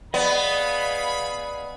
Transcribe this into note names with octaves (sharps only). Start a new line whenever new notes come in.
B3 G#4 D5 D#5 F5 B5